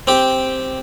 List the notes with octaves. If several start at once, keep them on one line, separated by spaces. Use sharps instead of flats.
C4 G4